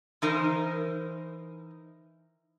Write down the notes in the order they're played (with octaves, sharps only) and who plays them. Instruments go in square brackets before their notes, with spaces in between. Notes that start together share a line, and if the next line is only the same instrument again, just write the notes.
[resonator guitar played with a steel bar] E3 D#4 A#4 C5